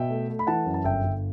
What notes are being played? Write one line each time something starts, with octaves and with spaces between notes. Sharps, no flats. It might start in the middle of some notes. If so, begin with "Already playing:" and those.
Already playing: B2 E5 G5
A3
A3
B5
E3 F#5 A5
F#2
A5
G1 E5 G5
G1